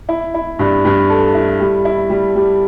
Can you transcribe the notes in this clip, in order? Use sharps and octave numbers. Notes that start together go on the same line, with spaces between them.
E4
E4
G2
G2
A4
E4
G3
E4
G3
G3